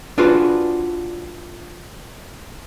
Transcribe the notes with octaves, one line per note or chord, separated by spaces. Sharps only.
D4 F4 F#4 G#4 B4 C5